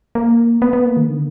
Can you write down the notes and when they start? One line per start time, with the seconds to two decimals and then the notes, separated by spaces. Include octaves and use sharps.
0.15 A#3
0.62 B3
0.73 B3
0.85 A#3
0.97 D#3
1.09 D3